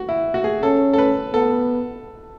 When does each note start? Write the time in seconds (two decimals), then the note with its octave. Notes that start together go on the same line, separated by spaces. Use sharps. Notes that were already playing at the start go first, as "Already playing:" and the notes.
Already playing: F#4
0.09 E4
0.34 F#4
0.44 G#4
0.62 C#4 A4
0.93 A4
0.98 B4
1.34 B3 A4